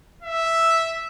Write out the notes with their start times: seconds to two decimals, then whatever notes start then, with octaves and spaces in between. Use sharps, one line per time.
0.23 E5